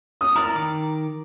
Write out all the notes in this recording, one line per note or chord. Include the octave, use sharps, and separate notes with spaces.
D#6
E4 A#4 D5 A#5
D#3 D6